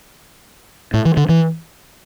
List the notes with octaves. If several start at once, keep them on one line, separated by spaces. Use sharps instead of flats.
A2
E3
D3
E3